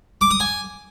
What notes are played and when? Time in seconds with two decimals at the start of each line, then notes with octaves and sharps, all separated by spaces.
0.21 D6
0.31 D#6
0.40 G#5